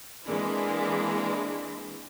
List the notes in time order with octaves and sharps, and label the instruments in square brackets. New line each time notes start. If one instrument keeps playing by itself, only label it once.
[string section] E3 G#3 A#3 C4 D4 E4